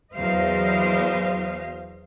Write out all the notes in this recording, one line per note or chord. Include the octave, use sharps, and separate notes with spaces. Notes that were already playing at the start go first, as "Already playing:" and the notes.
E2 F#3 C5 D#5 F5